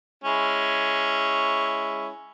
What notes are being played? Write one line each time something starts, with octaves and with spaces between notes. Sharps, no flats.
G#3 C#4 E4